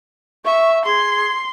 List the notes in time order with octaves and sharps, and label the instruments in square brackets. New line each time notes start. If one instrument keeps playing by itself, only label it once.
[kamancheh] E5 [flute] C#6
[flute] G#4 [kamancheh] C6